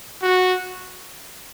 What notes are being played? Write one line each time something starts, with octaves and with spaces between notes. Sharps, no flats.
F#4